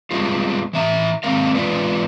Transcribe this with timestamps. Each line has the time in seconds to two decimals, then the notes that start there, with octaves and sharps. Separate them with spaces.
0.11 G3 G#3 B3 F4
0.73 E3 E5 A#5
1.23 D#3 G#3 C4 A#4 F5
1.55 E3 G#3 F4 B4 D5